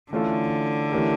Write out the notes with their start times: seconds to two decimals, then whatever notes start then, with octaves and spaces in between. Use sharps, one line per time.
0.12 D3 E3 A3 C#4 F4 A4
0.92 E3 A3 C#4 G4 A#4